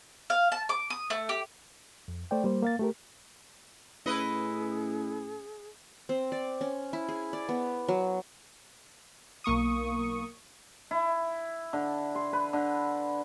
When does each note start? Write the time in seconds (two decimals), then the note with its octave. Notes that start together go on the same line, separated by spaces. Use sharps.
0.30 F5
0.52 A5
0.69 D6
0.90 D#6
1.10 A3
1.29 G4
2.08 F2
2.31 A3 C5 D5 G5
2.44 G3 A#3 C5
2.62 A#3 F5 A6
2.79 A3 G4 A#4
4.06 A2 C#4 E4 G#4 B4 D#5
6.09 C4
6.32 D5
6.61 C#4
6.93 E4
7.09 G#4
7.33 D5
7.49 B3
7.88 F#3
9.44 B1 A#3 C#6 D#6
10.91 E4
11.73 D3
12.15 C6
12.33 B4
12.53 D3